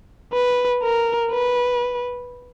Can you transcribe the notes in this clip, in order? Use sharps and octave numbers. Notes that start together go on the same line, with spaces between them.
B4
A#4
B4